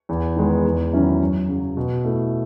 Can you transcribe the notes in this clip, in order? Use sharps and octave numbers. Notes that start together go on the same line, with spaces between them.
E2
D#3 G#3 B3
E2
D#3 F#3 C#4 E4
F#2
C#3 F#3
B2
A3 E4